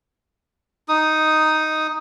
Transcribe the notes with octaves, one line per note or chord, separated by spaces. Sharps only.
D#4 D#6